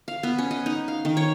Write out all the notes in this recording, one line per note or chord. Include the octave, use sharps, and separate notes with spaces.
F5
B3
C#4
D#5
D#4
F5
D#3
C#5